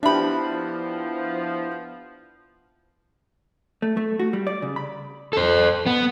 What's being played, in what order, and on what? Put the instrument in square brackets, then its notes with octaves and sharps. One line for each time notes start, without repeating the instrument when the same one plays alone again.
[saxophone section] F3 [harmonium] B3 E4 [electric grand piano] D4 G4 [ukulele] E5 B5
[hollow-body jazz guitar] A3
A3
F#4
G3
D5
C#3
B5
[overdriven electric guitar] A4 C5
B3